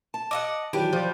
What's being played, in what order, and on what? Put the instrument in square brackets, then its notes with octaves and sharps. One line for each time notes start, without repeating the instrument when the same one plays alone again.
[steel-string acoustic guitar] A5
[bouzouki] D#5 E5 F#5 [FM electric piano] D6
[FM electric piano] D#3 E3 F#3 [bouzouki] D4 G4 B4
[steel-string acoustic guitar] F3 [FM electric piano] D5 G6